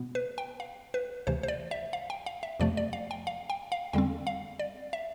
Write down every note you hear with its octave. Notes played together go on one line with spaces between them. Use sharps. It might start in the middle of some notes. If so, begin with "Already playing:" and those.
Already playing: B2 B3
B4
G5
F5
B4
D2 C3 E3 C5
C5
D5
E5
F5
G5
F5
E5
F2 C3 F3 A3 D5
D5
F5
G5
F5
G5
F5
E2 D3 G3 C4 G5
F5
D5
E5